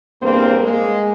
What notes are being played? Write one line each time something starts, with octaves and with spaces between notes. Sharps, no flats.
E2 G2 A#3 C4 A#4 C5
G#3 A#3